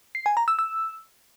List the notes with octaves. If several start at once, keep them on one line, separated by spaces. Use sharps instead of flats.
C7
G#5
A#5
E6
E6